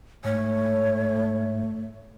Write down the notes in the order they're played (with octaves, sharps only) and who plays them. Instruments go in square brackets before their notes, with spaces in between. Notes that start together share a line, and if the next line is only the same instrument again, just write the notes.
[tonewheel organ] G#2 [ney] A3 [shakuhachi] C#5